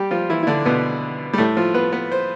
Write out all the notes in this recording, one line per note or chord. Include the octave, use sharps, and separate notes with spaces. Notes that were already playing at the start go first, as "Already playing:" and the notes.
Already playing: G3 G4
F3 F4
E3 E4
E4
D3 D4
B2 B3
G3
A2 A3
F3 F4
B3 B4
B3 B4
C5